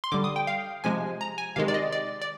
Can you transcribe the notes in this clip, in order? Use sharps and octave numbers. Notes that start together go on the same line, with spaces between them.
C6
D3 G3 D6
D#6
G5
F5
C3 F3 G#3 G#5
A#5
G#5
C3 D#3 G#3 F5
D5
D#5
D5
D5